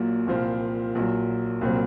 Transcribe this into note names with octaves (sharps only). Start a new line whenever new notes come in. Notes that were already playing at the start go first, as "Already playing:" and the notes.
Already playing: A#1 A#2 F#3
C2 A#2 F3 C4
A#1 A#2 F#3
C2 A#2 F#3 C4